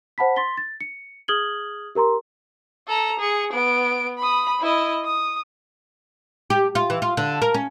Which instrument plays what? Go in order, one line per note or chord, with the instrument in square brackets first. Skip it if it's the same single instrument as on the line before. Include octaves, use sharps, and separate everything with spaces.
[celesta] C5 F#5 A5 B5 B6
C6 A6 B6 G7
A6
C#7
G#4 D#6 F6 G#6 F#7 G7
G4 A#4 A#5 C6
[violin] A4 A#5
G#4 C#7
B3 D7
B5 D#6
E4 D#5
D#6
[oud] G4
F4
E3
F4
D3
A#4
C#4